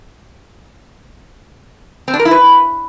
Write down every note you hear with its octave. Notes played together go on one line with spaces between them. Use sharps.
C4
D4
A#4
E4
B4